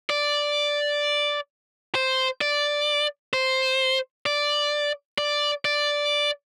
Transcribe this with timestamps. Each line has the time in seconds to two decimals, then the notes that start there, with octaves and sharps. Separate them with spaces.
0.10 D5
1.95 C5
2.41 D5
3.33 C5
4.26 D5
5.18 D5
5.65 D5